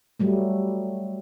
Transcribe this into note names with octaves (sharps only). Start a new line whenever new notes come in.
F#3 G3 A3